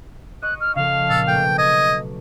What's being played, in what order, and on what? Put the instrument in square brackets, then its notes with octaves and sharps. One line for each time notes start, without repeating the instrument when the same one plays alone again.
[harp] D#5 C#6 [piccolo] F#6
[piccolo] F6
[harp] C#3 F3 A4 [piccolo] F5
[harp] A#2 [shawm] A4
[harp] B2 F#3 A3 [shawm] G5
[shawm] D#5 [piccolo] G#6